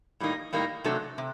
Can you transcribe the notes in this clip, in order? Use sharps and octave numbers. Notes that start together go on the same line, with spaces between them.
A2 G3 A#3 D#4
A2 G3 A#3 D#4
C3 F#3 A3 D4 A4
C3